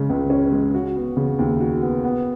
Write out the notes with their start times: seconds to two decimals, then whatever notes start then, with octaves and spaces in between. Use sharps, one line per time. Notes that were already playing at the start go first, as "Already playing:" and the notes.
Already playing: C#3 G#3 C#4
0.09 C#2
0.30 C#4
0.52 G#3
0.74 F#4
0.96 B3
1.17 C#3
1.39 D#2
1.60 F#4
1.82 B3
2.04 B3